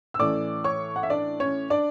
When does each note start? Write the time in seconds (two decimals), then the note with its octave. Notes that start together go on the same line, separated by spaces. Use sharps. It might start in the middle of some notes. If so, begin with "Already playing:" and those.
0.14 E6
0.19 A2 E3 A3 C#4 D5 D6
0.64 C#5 C#6
0.96 F#5
1.03 E5
1.10 D4 D5
1.40 C#4 C#5
1.70 D4 D5